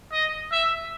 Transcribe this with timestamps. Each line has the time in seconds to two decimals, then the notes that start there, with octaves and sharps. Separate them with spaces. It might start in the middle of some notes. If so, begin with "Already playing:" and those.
0.13 D#5
0.52 E5